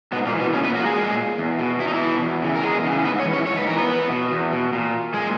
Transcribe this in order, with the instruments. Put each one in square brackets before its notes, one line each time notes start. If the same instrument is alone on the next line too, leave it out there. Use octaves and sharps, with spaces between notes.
[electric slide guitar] G#2 B2 B3
A#2 A#3
E3
B2 B3
A#2 C#3 C#4
B3 B4
A#3 A#4
F#4
G#3 G#4
A#2
E2
B2
E2 E4
D#4
E3 E4
B2
E2
C#3 E3
A#4
E2 G#3 G#4
C#3 E3
G#2 B3 B4
C#4 C#5
E3
C#4 C#5
G#2 C#5
B4
E3 A#4
B3 B4
E2
B2
E2
B2
A#2
A#2 G#3 G#4